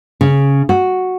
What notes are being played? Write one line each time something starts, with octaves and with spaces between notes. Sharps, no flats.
C#3
F#4